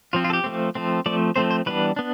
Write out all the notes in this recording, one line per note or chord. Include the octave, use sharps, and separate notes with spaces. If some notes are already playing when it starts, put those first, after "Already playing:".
F3 C4 F4
F4
A4
G4
F3 A3 C4
F3 A3 C4
F3 A3 C4 D5
F3 A3 C4 C5
C5
E3 G3 B3 D4 B4
B3 D4